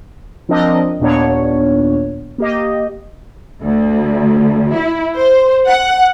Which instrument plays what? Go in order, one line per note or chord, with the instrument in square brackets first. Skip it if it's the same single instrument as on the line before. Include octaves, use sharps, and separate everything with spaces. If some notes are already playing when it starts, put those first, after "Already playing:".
[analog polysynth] F3 C4 D4 A#4 D#5
D#2 A#2 B3 D4 C#5
A#3 G4 D#5
[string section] D2
E4
C5
F#5